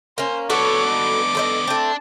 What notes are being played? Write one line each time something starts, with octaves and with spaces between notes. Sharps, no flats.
A#3 C#4 C5
B3 D4 F#4 A4 B4 C#5 D6
D#4
A4 C5 D#5
A3 C4 D4 A5